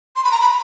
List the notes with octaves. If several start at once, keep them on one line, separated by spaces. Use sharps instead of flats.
C6
B5
A#5
B5